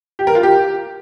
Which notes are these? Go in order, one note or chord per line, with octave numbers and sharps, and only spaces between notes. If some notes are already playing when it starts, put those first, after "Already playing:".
G4
A#4
F4
G4